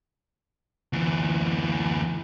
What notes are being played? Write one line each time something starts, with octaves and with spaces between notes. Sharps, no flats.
D2 E3